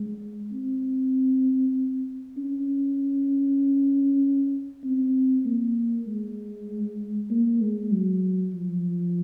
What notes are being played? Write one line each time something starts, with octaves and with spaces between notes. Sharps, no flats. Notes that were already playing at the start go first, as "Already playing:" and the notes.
Already playing: G#3
C4
C#4
C4
A#3
G#3
A#3
G#3
F#3
F3